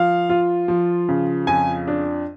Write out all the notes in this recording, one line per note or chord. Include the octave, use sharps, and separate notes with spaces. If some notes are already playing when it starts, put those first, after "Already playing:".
Already playing: F3 F5
F4
F3
C#3
F2 G#5
D4